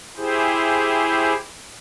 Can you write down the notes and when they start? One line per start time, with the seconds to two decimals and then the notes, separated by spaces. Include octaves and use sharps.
0.17 E4 G4 G#4 C5